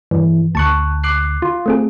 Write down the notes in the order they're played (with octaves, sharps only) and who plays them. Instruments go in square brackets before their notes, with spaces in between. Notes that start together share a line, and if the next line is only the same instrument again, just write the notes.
[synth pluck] G2 [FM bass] E3
[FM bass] D2 [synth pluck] A5 C#6 F#6
[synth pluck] D6 F#6 C7
[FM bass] F4
[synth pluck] A3 C4 G#4